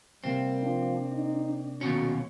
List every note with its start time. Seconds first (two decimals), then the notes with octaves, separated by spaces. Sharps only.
0.24 C3 G3 A#3 C4 E7
0.63 F3 D4
1.13 D#4
1.81 D#2 B2 C#4 F#4